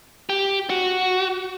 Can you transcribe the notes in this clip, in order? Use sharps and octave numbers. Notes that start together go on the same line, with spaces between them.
G4
F#4